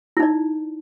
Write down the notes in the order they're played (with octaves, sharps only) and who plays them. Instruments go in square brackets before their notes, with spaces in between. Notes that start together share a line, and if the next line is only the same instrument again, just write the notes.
[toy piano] E4
D#4
D5